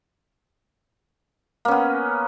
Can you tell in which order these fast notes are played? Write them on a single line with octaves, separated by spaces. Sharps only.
A#3 C#4 B3